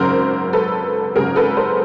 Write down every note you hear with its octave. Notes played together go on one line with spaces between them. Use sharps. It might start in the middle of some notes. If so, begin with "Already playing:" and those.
Already playing: G#1 F#2 C#3 A#4 C5
A4 B4
G#1 F#2 C#3 G#4 A#4
A4 B4
A#4 C5